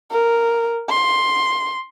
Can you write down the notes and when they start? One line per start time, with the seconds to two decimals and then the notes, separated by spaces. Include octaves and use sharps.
0.11 A#4
0.90 C6